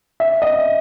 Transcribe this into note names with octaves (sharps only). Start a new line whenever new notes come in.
E5
D#5